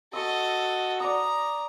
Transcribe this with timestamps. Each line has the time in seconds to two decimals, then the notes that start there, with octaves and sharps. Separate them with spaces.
0.13 F#4 A4 D#5 C#6 E6
1.00 D5 A#5 D#6